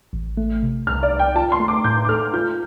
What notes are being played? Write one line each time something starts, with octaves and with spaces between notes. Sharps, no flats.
A1
A3
C3
C2 F6
D5
C2
G5
F4 A5
C6
A3
D6
A2 G6
D6
A4 F6
F4 G6